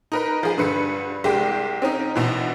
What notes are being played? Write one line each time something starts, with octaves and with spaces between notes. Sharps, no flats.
D#4 A#4 B4
F3 G#4
G2 D3 B4 C#7
C2 G#3 G4 G5
C4 C#4 D#4
A#1 B2 E3